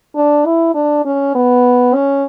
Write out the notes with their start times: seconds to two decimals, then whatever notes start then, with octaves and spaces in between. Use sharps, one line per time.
0.16 D4
0.46 E4
0.75 D4
1.05 C#4
1.35 B3
1.94 C#4